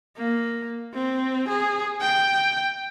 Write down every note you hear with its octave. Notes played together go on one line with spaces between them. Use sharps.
A#3
C4
G#4
G5